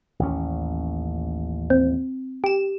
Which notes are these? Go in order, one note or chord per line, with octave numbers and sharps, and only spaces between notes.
A1 D#2 C#4
C4
G4 E7